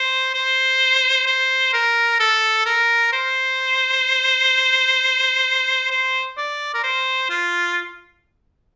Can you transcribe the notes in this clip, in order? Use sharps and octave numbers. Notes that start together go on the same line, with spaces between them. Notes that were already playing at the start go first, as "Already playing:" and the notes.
Already playing: C5
C5
C5
A#4
A4
A#4
C5
C5
D5
A#4
C5
F4